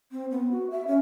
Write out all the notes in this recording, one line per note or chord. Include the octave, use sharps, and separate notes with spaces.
C4
B3
F#4
E5
C#4